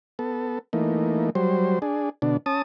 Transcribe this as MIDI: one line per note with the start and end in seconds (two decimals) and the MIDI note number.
0.19 0.59 59
0.19 0.59 69
0.73 1.30 52
0.73 1.30 57
0.73 1.30 58
0.73 1.30 63
1.35 1.79 54
1.35 1.79 55
1.35 1.79 72
1.82 2.09 62
1.82 2.09 68
2.22 2.37 47
2.22 2.37 50
2.22 2.37 62
2.46 2.62 61
2.46 2.62 81
2.46 2.62 87